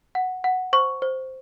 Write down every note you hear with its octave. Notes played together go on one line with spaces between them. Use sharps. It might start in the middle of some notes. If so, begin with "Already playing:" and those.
F#5
F#5
C5 C#6
C5